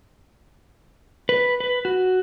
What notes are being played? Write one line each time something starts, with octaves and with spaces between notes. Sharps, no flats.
B4
B4
F#4